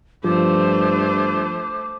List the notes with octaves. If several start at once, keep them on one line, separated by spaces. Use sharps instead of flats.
G2 F3 A3 C5 D6